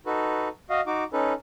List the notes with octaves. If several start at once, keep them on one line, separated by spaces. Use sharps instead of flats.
D#4 F#4 A4 B4
F#4 D#5 F5
D#4 F#4 D6
C#4 D#4 A4 B4